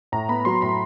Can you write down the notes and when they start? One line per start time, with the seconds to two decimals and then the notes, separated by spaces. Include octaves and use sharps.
0.12 A2 A#5
0.29 B3 B5
0.45 F#3 C6
0.62 A2 B5